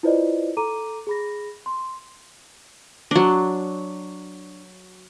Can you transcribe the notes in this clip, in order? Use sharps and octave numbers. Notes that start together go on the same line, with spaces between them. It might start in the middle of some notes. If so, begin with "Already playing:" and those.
E4 F4 B4 C5 D5 D#5
A4 A#5 D6 D#7
G#4 B5 A#6
C6
F#3 D4